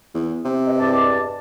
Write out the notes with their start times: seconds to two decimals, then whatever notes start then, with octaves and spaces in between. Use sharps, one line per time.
0.14 E2
0.45 C3
0.66 B4 D#5
0.80 E2 G2 D5 D#5 A5 D6